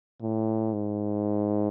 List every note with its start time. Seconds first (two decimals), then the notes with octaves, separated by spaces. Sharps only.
0.22 A2
0.73 G#2